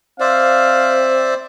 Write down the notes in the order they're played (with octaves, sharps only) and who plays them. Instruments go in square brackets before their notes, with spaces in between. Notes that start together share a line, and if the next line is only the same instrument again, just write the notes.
[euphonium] C4 [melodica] C5 D5 E5 [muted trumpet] F5